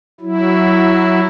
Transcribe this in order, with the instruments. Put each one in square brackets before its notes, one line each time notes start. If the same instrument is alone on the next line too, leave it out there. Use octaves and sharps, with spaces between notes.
[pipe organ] F#3 E4